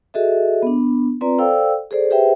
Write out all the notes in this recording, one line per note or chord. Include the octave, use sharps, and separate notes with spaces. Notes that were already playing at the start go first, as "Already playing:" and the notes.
F#4 G#4 A4 D#5 E5
B3 D4
C4 F4 B4 D5 A#5
A4 C5 D5 F5 G5 E6
G#4 A4 C5 D5
G4 G#4 B4 C5 E5 G5